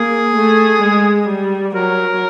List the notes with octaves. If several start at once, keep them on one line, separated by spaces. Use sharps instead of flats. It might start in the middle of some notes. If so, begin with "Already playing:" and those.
Already playing: A#3 G#4
A3
G#3
G3
F#3 A#4